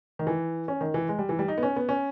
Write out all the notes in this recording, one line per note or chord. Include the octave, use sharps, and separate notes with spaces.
D#3
E3
C#4
D#3
E3
G#3
G3
E3
G3
D#4
B3
C#4
B3
C#4